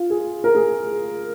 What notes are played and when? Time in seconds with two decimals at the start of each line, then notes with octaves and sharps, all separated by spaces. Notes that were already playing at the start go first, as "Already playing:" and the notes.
Already playing: F4
0.10 G#4
0.44 A#4
0.55 G#4